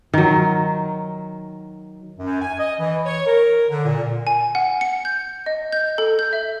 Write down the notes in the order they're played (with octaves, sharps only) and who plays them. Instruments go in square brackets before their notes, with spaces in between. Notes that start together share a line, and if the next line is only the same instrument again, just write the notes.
[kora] D#3 F#3
[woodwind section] F#2
G#5
D#5
E3
C#5
A#4
D3
A#2
[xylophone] G#5
F#5
C#7
G6
D#5
G6
A4
G6
E5